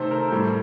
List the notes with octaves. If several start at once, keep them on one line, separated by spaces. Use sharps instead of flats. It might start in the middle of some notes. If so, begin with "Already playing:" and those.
Already playing: C3 D#3 A3 A4 C5
A#4
A2 G3